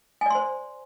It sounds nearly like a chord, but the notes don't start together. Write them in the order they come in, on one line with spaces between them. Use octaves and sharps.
G#5 D5 C6 C5